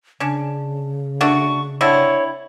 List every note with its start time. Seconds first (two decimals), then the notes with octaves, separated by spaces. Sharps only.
0.20 C#3 C#4 D4
1.21 A3 D4 F#4 C#6
1.81 D3 C4 E4 C#5